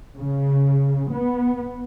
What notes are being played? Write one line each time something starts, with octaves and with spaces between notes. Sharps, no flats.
C#3
B3